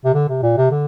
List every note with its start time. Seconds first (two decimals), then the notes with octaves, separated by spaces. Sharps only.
0.05 C3
0.14 D3
0.29 C3
0.42 A#2
0.57 C3
0.71 D3